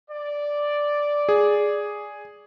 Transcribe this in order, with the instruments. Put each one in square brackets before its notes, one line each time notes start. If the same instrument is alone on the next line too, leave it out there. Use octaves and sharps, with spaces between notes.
[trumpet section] D5
[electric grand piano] G#4